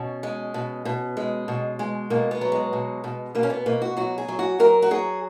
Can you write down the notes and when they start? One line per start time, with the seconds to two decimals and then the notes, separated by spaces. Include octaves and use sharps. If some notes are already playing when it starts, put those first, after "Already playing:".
Already playing: B2 C#4
0.23 G#3
0.54 B2
0.85 B2
1.17 G#3
1.48 B2
1.79 G#3
2.10 B2 A#3
2.31 B3
2.41 F#3
2.52 G#3
2.73 B2
3.04 B2
3.35 B2 A#3
3.43 C#4
3.50 B3
3.66 B2 A#3
3.82 F#4
3.97 F#3 F#4
4.18 G#4
4.28 F#3
4.39 F#4
4.59 F#3 A#4
4.82 F#4
4.91 F#3 G#4